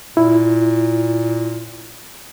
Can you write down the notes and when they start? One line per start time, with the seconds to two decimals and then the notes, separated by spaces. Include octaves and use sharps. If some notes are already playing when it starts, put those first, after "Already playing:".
0.17 A#2 E4